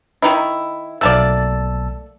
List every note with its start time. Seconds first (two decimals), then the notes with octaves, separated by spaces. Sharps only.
0.22 D#3 D#4 E4
1.01 B1 A3 A#3 D5 A5 E6